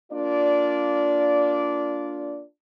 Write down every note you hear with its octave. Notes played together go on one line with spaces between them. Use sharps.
A#3 D4 F4 D5